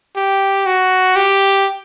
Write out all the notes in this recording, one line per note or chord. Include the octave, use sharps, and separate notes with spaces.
G4
F#4
G4